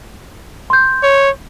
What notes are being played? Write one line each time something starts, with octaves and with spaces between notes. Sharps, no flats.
C6 G6
C#5